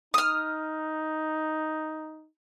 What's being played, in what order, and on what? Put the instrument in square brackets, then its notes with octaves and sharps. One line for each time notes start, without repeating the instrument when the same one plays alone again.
[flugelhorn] D#4 [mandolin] D#6 F6